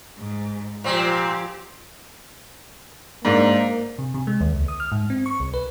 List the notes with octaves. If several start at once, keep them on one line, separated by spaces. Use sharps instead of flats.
G#2
A#2 F3 C4 G4
G#2 A#3 D4
C3
C3
G#3
D#2
C#2
D#6
F6
G#2
C4
C#6
C2
B4